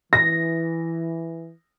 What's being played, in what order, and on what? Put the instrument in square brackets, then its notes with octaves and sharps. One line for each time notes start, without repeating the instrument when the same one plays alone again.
[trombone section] E3 [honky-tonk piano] A#6